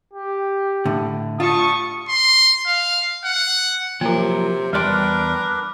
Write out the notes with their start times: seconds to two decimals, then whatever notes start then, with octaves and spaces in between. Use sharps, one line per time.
0.13 G4
0.85 A2 D3
1.40 G3 F4 A5 C#6 D#6
2.09 C6
2.67 F5
3.25 F#5
4.01 C3 F3 F#3 A#3 F4 A#4
4.73 E2 G3 D4 A#4 B4 D5 G5 C6